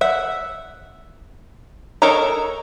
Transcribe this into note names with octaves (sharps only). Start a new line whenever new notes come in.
E5 F#5
A4 A#4 C#5 D#5 A#5